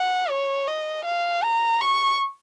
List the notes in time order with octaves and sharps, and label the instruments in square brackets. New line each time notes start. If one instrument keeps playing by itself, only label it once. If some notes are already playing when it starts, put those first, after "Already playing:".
Already playing: [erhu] F#5
C#5
D#5
F5
A#5
C#6